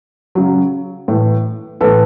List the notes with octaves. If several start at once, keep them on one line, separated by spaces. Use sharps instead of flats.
C#3 F#3
A2 E3
A2 E3 A4 B4